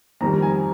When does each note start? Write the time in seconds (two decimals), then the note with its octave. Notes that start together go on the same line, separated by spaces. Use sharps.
0.21 F2 D#3 G3 A#5
0.42 G#5